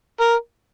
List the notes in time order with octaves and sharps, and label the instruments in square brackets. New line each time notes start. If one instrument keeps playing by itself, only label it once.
[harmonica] A#4